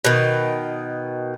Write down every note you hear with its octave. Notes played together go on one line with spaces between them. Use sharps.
B2 D#3